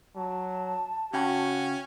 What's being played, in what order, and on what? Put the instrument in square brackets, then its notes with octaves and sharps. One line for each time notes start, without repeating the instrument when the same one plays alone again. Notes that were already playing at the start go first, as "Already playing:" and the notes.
[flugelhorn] F#3 [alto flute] A5
[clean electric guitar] C#3 G5 B5 [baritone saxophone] C#4 [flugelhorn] F#4